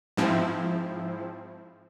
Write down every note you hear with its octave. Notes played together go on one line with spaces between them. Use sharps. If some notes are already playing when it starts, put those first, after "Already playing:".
G#2 F3 C4 E4